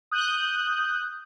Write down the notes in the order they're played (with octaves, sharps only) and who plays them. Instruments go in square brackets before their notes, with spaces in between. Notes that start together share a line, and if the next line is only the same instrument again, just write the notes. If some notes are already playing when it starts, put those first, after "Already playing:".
[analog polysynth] D#6 F#6 G6